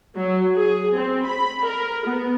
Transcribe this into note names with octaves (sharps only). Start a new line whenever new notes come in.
F#3
G#4
C4
B5
A#4
B3